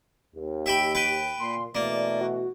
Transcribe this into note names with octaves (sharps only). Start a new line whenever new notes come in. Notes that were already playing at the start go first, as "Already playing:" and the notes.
D#2
G4 E5 G5 B5
B4 G5
A#2 C6
B2 E3 A3 A#3 D5
F#4